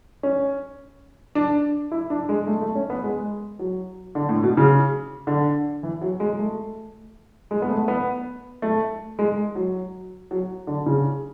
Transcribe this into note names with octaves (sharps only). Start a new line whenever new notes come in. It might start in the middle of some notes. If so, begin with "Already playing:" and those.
C#4
D4
E4
D4
G#3
A3
A3
C#4
B3
G#3
F#3
D3
A2
B2
C#3
D3
E3
F#3
G#3
A3
G#3
B3
A3
B3
A3
G#3
F#3
F#3
D3
C#3